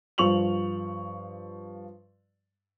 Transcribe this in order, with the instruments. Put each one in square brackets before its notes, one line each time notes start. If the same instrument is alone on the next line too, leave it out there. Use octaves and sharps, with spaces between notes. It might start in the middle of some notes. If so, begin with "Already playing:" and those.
[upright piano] G2 F3 C#6 F7 F#7